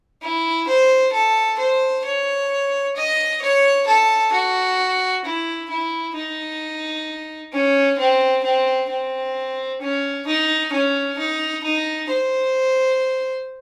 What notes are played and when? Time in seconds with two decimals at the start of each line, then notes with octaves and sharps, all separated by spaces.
0.22 E4
0.68 C5
1.13 A4
1.58 C5
2.05 C#5
2.96 D#5
3.42 C#5
3.87 A4
4.32 F#4
5.25 E4
5.70 E4
6.16 D#4
7.53 C#4
7.98 C4
8.44 C4
8.89 C4
9.81 C#4
10.27 D#4
10.72 C#4
11.18 D#4
11.63 D#4
12.10 C5